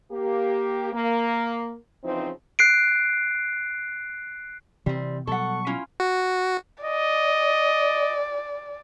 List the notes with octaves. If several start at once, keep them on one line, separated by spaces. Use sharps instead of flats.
A#3 G4
A#3
C#3 E3 F3 C4 D#4
F#6 C7 D7
C3 E3 G3 C4
B2 F#3 G3 A4 F#5 C#6
C#4 E4 F4
F#4
D5 D#5